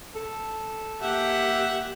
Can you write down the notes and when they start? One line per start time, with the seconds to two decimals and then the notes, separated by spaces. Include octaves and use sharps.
0.16 A4
1.02 A#3 G4 E5 F#5